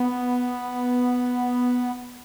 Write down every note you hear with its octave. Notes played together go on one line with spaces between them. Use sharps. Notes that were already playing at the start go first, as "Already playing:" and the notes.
Already playing: B3